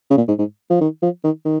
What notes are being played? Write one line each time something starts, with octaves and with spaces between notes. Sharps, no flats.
C#3
A#2
G#2
G#2
F3
D#3
F3
D#3
D#3